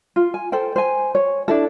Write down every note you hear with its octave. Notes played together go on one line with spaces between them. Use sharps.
F4
G#5
A4 C5 G5
C5 G#5
C#5
D4 E4 A4